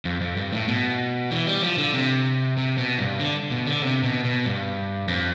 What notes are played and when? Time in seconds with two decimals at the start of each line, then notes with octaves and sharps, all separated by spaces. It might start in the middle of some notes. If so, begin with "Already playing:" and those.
0.05 F2
0.21 F2
0.37 G2
0.53 A2
0.68 B2
1.31 E3
1.47 G3
1.62 F3
1.78 D3
1.94 C3
2.57 C3
2.78 B2
2.99 G2
3.20 D3
3.51 B2
3.67 D3
3.82 C3
4.03 B2
4.25 B2
4.46 G2
5.08 F2